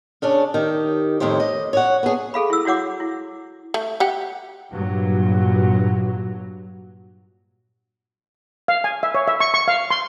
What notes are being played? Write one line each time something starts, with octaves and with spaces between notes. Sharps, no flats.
C#3 C#4 D4
D#3 G4
F2 A2 D#3 E4 G4 C5
D#5
C#5 D5 F#5
B3 G#4
G#4 A4 F5 B5
E4 E6
E4 F#4 C#5 F#5 D6
E4
A3
G4 F#5
G2 A#2 F#3
F5
G#5
E5
C#5
E5
C#6
C#6
F5
C6